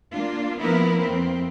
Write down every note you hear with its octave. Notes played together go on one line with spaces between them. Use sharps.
A#3 D4 F4
F3 A#3 B3 E4 A#4 B4
F2 C4